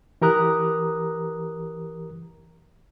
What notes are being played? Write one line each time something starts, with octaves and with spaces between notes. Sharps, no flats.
E3 G4 A#4 A#5 D#6 F#6